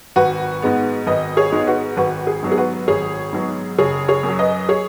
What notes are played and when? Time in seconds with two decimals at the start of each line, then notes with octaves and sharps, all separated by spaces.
0.16 G#1 F#4 B4
0.62 G#2 G#3 B3
1.07 G#1 B4 D#5
1.37 G#4 C#5
1.52 G#2 G#3 B3
1.67 F#4 B4
1.97 G#1 F#4 B4
2.27 G#4
2.43 G#2 F#3 B3
2.52 G#4
2.58 F#4 B4
2.88 G#1 G#4 C#5
3.33 G#2 F#3 B3
3.79 F#1 G#4 C#5
4.08 G#4 C#5
4.23 F#2
4.28 F#3
4.39 B4 D#5
4.69 G#4 C#5